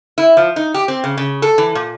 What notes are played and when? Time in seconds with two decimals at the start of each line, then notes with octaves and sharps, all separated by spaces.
0.18 E4
0.37 F3
0.56 D#4
0.74 G4
0.88 C4
1.04 C#3
1.17 C#3
1.42 A4
1.58 E3
1.75 A#2